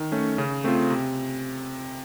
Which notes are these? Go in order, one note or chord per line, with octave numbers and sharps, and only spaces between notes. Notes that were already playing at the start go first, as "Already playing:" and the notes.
Already playing: D#3
A3 C#4
C#3
A3 C4 F4
C3